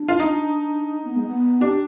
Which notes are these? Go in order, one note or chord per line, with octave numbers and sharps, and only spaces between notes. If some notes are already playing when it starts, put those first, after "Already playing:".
Already playing: D4
F4
D#4
B3
G#3
B3
D4 G4